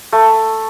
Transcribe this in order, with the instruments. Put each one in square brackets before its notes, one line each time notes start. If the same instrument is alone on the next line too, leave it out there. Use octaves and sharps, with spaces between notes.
[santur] A3